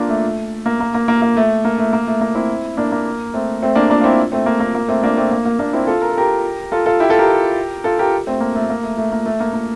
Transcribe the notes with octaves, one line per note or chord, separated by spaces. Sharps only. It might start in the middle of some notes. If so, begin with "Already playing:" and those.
Already playing: A#3 D4 F4
A3
A#3
A#3
A#3
A#3
A#3
A3
A#3
A3
A#3
A3
A#3
C4 E4
A#3 D4
A#3
A3 C4
A3 C4
A#3 D4
A#3 D4
F4
C4 E4
A3 C4
A#3
A#3
A#3
A3 C4
A#3 D4
A3 C4
A#3
A#3
A#3 D4
C4 E4
F4 A4
A#4
A4
G4 A#4
F4 A4
F4 A4
E4 G4
F4 A4
G4 A#4
F4 A4
G4 A#4
A3 C4
A#3
A3
A#3
A3
A3
A#3
A3
A#3
A#3